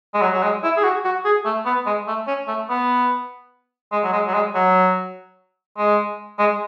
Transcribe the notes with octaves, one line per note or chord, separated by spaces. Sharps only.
G#3
F#3
F#3
G#3
E4
G#4
F#4
F#4
G#4
A3
B3
G#3
A3
C#4
A3
B3
G#3
F#3
G#3
F#3
G#3
F#3
G#3
G#3